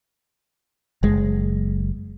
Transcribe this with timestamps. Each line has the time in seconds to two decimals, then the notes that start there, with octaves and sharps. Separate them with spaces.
1.03 F#1 G#3